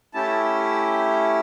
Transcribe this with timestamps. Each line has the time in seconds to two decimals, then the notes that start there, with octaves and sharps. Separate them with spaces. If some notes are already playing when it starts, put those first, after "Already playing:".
0.14 A3 C#4 E4 G4 A5